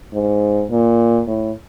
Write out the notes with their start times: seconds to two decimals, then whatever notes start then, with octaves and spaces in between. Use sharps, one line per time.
0.13 G#2
0.70 A#2
1.27 A2